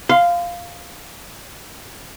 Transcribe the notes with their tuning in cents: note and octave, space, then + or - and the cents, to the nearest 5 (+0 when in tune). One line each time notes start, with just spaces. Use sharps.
F5 +0 C6 -35